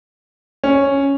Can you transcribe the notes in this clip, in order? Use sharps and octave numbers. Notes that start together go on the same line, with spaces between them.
C#4